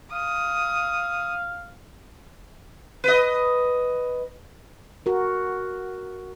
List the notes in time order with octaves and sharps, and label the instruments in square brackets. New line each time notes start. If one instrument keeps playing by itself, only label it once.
[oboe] F5 [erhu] D#6
[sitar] B4 D#5
[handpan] F#4 A#4